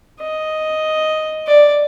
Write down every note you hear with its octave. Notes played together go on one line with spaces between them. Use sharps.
D#5
D5